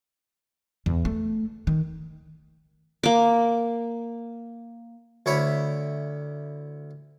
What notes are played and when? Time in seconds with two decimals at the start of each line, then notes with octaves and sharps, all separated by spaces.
0.86 E2
1.05 A3
1.67 D#3
3.03 A#3 D6
5.26 D2 E4 C#5 B5